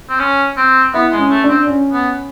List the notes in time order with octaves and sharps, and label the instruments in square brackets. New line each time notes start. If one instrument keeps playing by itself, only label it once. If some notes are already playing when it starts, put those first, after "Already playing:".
[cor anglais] C4
C#4
C4
[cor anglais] B3 [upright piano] E4
[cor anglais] G#3
[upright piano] C#4
[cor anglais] A3
[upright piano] D4
[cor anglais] C4
[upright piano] C#4
[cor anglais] B3